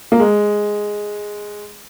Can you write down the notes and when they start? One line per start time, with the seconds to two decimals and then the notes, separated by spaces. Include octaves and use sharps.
0.12 A#3
0.19 G#3